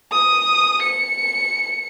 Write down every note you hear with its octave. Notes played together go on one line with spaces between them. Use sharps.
D#6
C#7